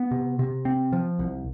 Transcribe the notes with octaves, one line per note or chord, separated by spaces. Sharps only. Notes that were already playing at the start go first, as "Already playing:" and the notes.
Already playing: B3
C3
C3
C4
F3
C2